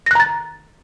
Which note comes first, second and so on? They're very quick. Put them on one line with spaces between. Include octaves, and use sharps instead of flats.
A#6 F#6 A#5 A6